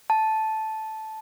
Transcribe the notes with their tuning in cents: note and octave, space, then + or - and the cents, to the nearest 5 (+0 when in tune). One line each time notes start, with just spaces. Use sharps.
A5 -10